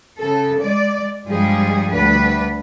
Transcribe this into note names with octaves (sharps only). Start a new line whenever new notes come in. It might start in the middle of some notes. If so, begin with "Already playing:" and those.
C#3 A4
G#3 D5
G2 F3 G3 G#3 G#4
D2 G3 D4 B4